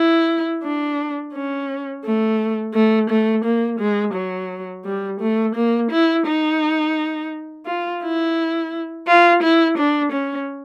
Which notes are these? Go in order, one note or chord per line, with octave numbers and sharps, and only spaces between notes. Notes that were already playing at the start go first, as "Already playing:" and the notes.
Already playing: E4
D4
C#4
A3
A3
A3
A#3
G#3
F#3
G3
A3
A#3
E4
D#4
F4
E4
F4
E4
D4
C#4